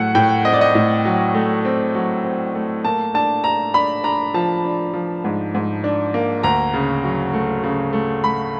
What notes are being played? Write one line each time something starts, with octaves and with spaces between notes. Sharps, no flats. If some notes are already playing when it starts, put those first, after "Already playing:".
Already playing: A2 F#3 A3 F#5
A2 G5
C4 D#5
D5
D#5
A2
F#3
A3
C4
F#3
C4
A3
A#3 A5
D4 A5
D4 A#5
D4 B5
D4 A#5
F3 A5
D4
F3
G#2
G#2
D4
A#3
D2 A#5
C#3
F#3
A3
C#3
A3
A3 B5